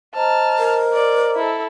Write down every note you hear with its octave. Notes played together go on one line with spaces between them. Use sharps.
C5 D#5 A5 A#5 F6
A#4
D5
E4 A4